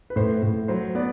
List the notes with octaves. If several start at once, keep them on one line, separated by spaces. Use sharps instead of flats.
B4
A2 C5
A2
F#3 C5
B3 B4 D5